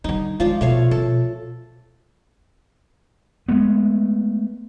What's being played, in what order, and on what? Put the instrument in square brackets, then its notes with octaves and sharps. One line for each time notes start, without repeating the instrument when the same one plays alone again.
[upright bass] D3 G3 [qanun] D#4
[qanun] F3 F4 D5 [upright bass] G#3
[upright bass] B2 [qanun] A3 C#5 F5
[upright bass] B2 [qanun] A4
[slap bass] G#3 A3 B3